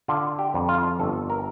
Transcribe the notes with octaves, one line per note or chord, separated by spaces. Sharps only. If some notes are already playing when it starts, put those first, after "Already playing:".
D3 F4
G4
F2
F4
G1 A4
A#4